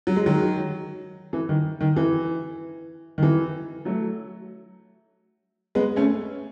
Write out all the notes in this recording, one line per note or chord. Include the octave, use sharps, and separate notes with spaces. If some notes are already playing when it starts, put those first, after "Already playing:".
F#3
G#3
D#3 F#3
E3
D#3
D#3
E3
D#3
E3
F#3 A3
G#3 B3
A3 C#4